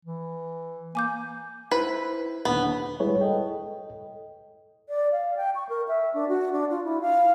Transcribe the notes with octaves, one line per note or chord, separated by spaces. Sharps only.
E3
A#3 G#5 D6 G6
E4 B4 C5
D#1 D3 B3
G3 G#3 E4 G#4 B4 C#5
A4 D#5 G5
D5
F5
G5
C#6
A#4
E5
D4
F#4
D4
F4
E4
F5